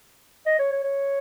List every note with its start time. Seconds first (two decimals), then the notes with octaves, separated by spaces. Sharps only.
0.46 D#5
0.59 C#5
0.72 C#5
0.84 C#5